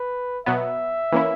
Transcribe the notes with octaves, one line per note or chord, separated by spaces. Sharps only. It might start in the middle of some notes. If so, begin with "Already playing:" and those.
Already playing: B4
B2 F#3 B3 E5
E3 A#3 C#4 E4